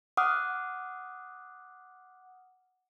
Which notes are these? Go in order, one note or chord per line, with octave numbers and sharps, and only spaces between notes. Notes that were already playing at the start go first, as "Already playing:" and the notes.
F#5 D6 D#6 F6 F#6